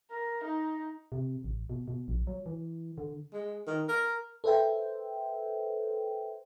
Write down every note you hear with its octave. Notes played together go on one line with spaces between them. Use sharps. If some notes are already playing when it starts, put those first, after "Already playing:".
A#4
D#4
C3
A1
B2
B2
A#1
F#3
E3
D3
G#3
D#3
A#4
A4 B4 C5 E5 G5